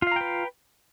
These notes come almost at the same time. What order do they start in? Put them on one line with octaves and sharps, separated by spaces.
F4 F5 A#5 G5 B4